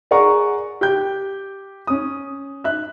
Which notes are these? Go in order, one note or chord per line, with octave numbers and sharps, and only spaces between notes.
G#4 A#4 D5 F#5 A#5 C#6
G4 G5 G6
C#4 D#6
E5 F#6